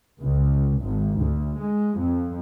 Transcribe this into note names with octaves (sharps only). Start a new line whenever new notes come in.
C#2
G#1
D2
G#3
F2